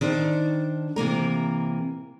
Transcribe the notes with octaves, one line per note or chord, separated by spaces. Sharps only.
D#3 D4 C5
C3 E3 A#3 A#4